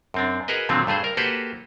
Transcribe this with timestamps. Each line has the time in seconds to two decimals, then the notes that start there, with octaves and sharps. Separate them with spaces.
0.14 F#2 C4 D4
0.48 F#4 G#4 A#4 B4 D#5
0.69 A#2 D3 D#3 F#3 A3 C4
0.87 G2 A3 G#4 C5
1.04 A#4
1.17 A#3 F#4 G4 A4 B4 C5